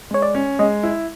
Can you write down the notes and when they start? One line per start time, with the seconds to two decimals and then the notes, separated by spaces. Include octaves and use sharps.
0.11 G#3 C#5
0.22 D5
0.35 C#4
0.59 G#3 D#5
0.83 E4